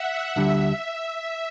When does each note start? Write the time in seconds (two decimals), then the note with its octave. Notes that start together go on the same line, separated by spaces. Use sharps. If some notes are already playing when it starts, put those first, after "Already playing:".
Already playing: E5 F#5
0.36 D2 D3 G3 E5